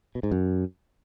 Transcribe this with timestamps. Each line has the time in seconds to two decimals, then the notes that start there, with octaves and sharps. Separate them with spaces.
0.15 B2
0.23 G#2
0.31 F#2